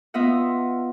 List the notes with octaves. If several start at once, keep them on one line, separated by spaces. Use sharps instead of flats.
B3 F4 D#5 E5 F#5